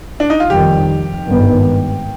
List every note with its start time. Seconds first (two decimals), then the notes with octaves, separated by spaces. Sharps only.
0.20 D4
0.30 D#4
0.40 F4
0.50 F1 F2 D#3 G3 G4
1.28 G#1 G2 D#3 B3